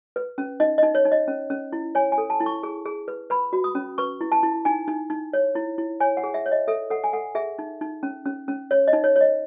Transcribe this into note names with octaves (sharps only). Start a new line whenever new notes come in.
B4
C#4
D#4 D#5
D#4 D#5
C#5
D#4
D#5
C#4
C#4
E4
C#5 G#5
G#5
A4
A5
E4
C#6
G#4
G#4
B4
B4 B5
F#4
D#6
C#4
B4 C#6
E4
A5
E4
D#4 G#5
D#4
D#4
C#5
E4
E4
C#5 G#5
F#5
G#4
E5
C#5
D#5
A4 E5
A4 F#5
G#5
A4 F#5
G#4 E5
D#4
D#4
C#4
C#4
C#4
C#5
D#5
D#4
C#5
C#5
D#5